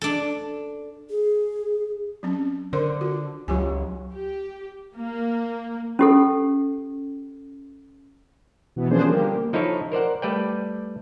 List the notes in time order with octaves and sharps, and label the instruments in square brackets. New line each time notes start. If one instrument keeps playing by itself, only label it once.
[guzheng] D4 A4
[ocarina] G#4
[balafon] F#3 C4 C#4
[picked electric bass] D3 [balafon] A#4 C5 C6
[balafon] F4 F#4
[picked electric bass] C#2 F#3 [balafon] F4 G4 G#5
[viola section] G4
A#3
[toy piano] C#4 G4 A4
[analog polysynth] B2 E3 B3
F3 A#3 C#4 D4 G#4 C5
D3 G3 A#3 G4
[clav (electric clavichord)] F3 D#4 E4 A4 C#5
A#4 C5 D5 F#5
G3 A3 B4 D5 G5